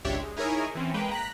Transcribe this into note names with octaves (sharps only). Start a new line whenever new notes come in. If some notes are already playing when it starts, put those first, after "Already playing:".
G#1 C#2 D4 G4 C#5 E5
G#3
D#4 E4 G#4 A#4 C#5 G#5
E3 C4 C#4
G#3 A#3 B4 G5
A#5 F#6 B6